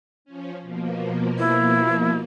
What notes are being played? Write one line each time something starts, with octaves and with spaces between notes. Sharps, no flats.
F3 C#4
B2 F3 A#3
E4